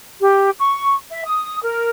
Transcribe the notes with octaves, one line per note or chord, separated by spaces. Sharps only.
G4
C#6
E5
D#6
A#4